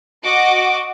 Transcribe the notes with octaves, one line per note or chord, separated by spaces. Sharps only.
F#4 D#5 D6 D7